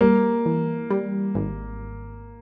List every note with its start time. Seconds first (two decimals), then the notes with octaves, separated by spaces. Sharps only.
0.01 G3 A#3
0.46 E3
0.90 G3
1.35 G#1